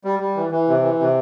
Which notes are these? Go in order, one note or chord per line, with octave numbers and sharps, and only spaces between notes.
G3
G3
E3
E3
C3
E3
C3